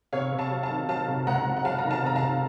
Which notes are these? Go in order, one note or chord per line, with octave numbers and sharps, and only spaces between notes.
C3 C#5 F5
C3
F5 A5
F#3
F5 A5
D#3
F#3 F5 A5
C3
C#2 F#5 A#5
C#2
F#5
F#3 F5 A5
A#5
D#3
F5 A5
C3 A#5
F5 A5
C3